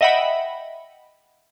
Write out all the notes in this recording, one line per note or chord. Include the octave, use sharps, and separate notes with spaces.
D#5 E5 F#5 G5 B5